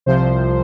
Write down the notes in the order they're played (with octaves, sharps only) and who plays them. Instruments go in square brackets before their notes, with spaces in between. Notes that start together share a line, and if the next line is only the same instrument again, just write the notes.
[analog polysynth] C2 C3 F3 C5